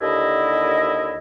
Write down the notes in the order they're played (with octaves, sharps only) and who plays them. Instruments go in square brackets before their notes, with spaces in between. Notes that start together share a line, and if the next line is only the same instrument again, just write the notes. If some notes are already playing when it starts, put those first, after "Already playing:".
[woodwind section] D#2 D3 E4 D#5